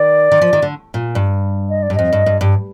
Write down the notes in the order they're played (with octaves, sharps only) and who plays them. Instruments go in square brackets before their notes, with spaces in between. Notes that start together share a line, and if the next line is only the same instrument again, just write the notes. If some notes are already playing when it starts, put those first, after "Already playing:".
Already playing: [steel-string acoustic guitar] D#3 [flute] D5
[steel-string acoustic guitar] D#3
F3
D#3
D3
A#2
G2
[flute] D#5
D5
[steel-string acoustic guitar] G2
[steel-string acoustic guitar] F2 [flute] D#5
[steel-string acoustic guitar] G2
G2
G2